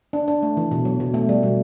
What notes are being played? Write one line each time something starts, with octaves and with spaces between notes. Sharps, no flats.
D4
D4
A3
E3
B2
F#3
B2
A3
G3
B2